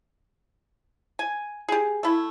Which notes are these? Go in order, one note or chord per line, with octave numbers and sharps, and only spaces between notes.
G#5
G4 G#4
A3 E4